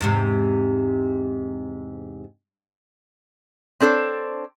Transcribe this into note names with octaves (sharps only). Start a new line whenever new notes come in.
E2 G#2 C3
C4 D4 A4 C5 C#5